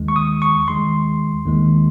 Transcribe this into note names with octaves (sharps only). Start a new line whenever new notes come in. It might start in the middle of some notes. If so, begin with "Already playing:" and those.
Already playing: D#2 D#3 G#3
C#6
D#6
C#6
D#2 D#3 G#3 C6
D#2 D#3 G#3